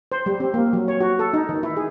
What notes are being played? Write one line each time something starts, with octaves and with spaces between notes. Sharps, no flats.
C5
G3
C4
A#3
F#3
C#5
F#4
A4
D#4
D#3
E4
G#4